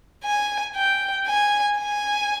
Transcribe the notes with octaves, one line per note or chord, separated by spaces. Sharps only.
G#5
G5
G#5
G#5